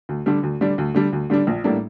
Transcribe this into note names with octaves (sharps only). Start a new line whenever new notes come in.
D2
D3 G3 D4
D2
D3 G3 D4
D2
D3 G3 D4
D2
D3 G3 D4
A#1
A2 G3 A#3 D4